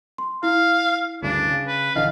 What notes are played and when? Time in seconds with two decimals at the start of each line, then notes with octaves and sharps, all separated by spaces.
0.18 C6
0.43 E4 F5
1.22 D2 G2 C#3 D4
1.49 C#3
1.67 B4
1.95 A#1 D3 E3 D#5 F5